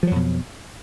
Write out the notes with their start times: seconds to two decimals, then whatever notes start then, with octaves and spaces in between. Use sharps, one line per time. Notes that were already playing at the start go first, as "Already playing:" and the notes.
0.03 F3
0.07 F#3
0.11 F2
0.16 B2